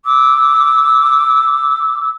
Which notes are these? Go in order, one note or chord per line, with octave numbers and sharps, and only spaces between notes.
D6 E6